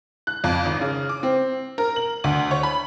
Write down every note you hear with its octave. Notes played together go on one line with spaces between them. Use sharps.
F#6
F2
G#1
C#3
D6
C4
A#4
F#7
D2
C#5
B5